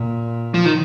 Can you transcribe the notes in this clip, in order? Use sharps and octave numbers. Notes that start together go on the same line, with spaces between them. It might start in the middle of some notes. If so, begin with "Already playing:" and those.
Already playing: A#2
F3
D#3